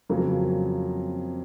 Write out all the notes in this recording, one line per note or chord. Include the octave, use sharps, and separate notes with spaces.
F2 C#3 F#3 A#3